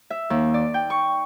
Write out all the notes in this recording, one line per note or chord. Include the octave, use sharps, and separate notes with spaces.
E5
D#2
D5
G5
C#6